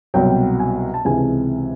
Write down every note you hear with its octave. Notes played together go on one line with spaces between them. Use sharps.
C2 B2 F#3 G5
G#5
A5
C#2 C3 E3 G#5